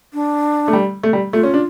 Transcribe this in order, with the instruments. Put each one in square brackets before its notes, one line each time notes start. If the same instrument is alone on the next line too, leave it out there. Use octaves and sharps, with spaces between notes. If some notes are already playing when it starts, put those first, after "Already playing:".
[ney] D4
[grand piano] A3
G3
A3
G3
[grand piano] A3 [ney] F4
[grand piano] C#4
D4